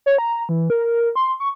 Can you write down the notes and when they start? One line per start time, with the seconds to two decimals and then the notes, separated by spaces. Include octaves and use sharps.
0.06 C#5
0.18 A#5
0.49 E3
0.70 A#4
1.16 C6
1.40 C#6